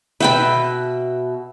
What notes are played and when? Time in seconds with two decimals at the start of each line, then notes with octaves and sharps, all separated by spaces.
0.20 B2 B4 E5 G5 B5